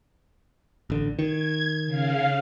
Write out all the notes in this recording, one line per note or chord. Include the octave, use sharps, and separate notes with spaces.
A1 D3
D#3 G#6
C#3 F5